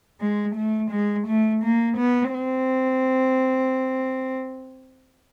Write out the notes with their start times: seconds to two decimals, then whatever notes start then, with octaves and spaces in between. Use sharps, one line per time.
0.20 G#3
0.56 A3
0.91 G#3
1.27 A3
1.63 A#3
1.98 B3
2.34 C4